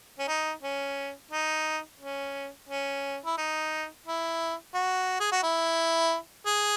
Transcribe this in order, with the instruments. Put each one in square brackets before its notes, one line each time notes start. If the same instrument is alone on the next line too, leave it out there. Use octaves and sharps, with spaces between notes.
[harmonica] C#4
D#4
C#4
D#4
C#4
C#4
E4
D#4
E4
F#4
G#4
F#4
E4
G#4